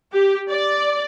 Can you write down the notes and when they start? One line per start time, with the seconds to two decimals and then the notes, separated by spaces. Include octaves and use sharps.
0.12 G4
0.50 D5